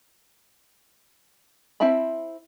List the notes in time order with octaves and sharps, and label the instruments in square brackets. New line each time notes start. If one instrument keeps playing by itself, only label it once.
[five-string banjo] C4 E4 E5 A5 B5